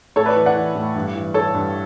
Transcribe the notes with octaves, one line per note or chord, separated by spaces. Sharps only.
A2 A4 C#5
B4 D5
E3
D5 F#5
E3
A2
G2
E3
E3 A4 C#5
G2